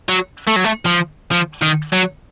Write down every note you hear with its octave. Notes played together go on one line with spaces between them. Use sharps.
F#3
A3
F#3
A3
F3
F3
D#3
F#3